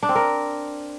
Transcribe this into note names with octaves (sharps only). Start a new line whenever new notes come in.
D4
C4
A#4